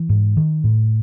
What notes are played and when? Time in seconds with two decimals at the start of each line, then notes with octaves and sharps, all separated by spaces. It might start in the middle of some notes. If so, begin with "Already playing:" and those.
Already playing: E3
0.09 G#2
0.37 D#3
0.64 A2